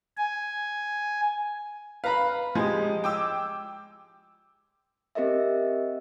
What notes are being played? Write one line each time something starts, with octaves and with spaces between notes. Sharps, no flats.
G#5
B4 F5 A#5 B5
F3 G#3 G4
G5 D6 E6
C4 G4 A#4 D#5 E5